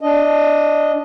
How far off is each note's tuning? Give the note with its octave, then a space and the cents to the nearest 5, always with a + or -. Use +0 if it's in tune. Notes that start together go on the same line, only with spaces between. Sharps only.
D4 -5 D#5 +0